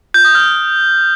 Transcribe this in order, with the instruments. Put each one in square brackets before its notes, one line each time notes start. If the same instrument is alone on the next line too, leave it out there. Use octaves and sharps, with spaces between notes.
[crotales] G6
D#6
F6